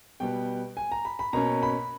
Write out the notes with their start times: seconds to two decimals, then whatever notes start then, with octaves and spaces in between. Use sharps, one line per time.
0.20 B2 G3 B3 G5
0.77 G#5
0.92 A#5
1.05 B5
1.19 B5
1.33 B2 A#3 C#4 A#5
1.63 B5